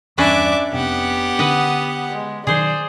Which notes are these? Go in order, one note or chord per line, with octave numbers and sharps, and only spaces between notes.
E2 G2 C#4 D4 B4 D5 E5 D6
F1 C3 B3 G4 F#5
D3 C#4 D4 B4 D#5
G#3
B2 D#3 F#3 G#4 C5 D5